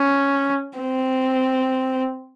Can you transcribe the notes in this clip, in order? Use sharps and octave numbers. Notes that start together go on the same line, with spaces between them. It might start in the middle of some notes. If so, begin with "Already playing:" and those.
Already playing: C#4
C4